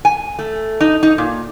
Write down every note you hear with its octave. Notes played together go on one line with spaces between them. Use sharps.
G#5
A3
D#4
D#4
A#2